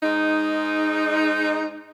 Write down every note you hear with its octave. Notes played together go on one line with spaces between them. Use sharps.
G#2 G#3 D#4